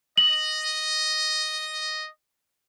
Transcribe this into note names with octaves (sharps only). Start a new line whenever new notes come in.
D#5 F#7